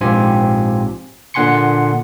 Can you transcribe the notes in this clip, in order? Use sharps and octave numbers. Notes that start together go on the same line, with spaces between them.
A#1 G#2 C4 F4 G4 G#5
A#2 D3 F#5 G#5 C6 C#7